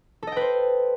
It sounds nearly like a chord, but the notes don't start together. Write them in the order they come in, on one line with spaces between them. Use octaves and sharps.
A4 D#5 G5 B4 C5